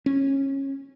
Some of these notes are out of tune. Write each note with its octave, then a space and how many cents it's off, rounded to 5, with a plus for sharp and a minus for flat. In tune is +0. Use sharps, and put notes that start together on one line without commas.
C#4 -20